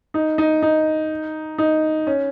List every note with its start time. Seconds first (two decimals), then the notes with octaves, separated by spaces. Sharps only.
0.14 D#4
0.38 D#4
0.62 D#4
1.58 D#4
2.07 C#4